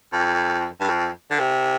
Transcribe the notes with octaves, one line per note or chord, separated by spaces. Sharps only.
F2
G2
F2
D3
C3